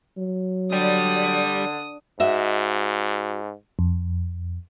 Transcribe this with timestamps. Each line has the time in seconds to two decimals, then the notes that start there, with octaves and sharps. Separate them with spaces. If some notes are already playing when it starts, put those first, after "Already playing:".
0.17 F#3
0.72 D3 G3 D#6
2.20 G#2 F#4 D#5 E5
3.79 F2